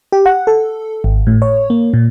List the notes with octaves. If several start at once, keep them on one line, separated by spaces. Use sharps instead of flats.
G4
F#5
A4
G#1
A2
C#5
A#3
A#2